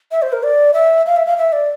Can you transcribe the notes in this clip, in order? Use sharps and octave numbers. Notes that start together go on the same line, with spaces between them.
E5
C5
A#4
D5
E5
F5
E5
F5
E5
D5